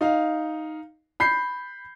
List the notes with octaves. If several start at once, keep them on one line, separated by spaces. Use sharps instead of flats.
D#4 F5
B5 G6 C7